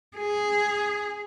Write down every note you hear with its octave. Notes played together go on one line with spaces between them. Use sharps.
G#4